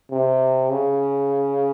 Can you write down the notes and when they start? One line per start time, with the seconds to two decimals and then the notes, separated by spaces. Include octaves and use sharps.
0.11 C3
0.71 C#3